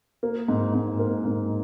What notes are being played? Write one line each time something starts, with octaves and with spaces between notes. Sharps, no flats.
A#3
G#2
G#2
A#3
G#2